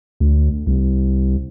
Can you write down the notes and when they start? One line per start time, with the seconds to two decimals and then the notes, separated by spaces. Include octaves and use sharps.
0.20 D2
0.67 C2